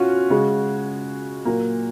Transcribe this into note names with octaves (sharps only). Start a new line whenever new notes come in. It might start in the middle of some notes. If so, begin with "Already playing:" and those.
Already playing: B2 C#4 F4 F#4
C#3 G#3
A#2 F#3 A#3